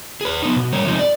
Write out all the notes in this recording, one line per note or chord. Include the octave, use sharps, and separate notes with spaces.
G#4 B4
B3 D#4
B2
G3 A#3 C#5
C3 F3 G#3 D#4
D5